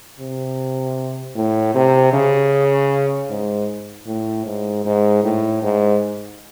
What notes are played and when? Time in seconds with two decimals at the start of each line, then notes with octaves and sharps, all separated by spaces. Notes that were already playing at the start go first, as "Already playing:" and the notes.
0.19 C3
1.35 A2
1.75 C3
2.13 C#3
3.30 G#2
4.07 A2
4.46 G#2
4.85 G#2
5.24 A2
5.63 G#2